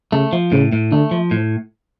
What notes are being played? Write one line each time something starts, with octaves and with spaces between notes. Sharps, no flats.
C#3 A3
F3
A2 C#3
A2
D3 A3
F3
A2